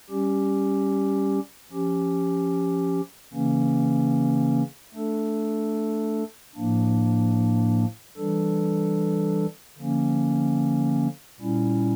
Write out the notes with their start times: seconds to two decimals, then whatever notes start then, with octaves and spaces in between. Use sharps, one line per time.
0.10 G3 C#4 G4
1.71 F3 C#4 G4
3.33 C#3 E3 A#3 C#4
4.94 A3 D4 A4
6.55 A2 F3 A#3 D4
8.17 E3 G3 D4 A4
9.78 D3 F3 A#3 C#4
11.40 A#2 G3 C#4 E4